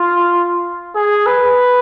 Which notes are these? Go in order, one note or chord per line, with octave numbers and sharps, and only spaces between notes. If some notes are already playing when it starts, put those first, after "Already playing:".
Already playing: F4
G#4
B4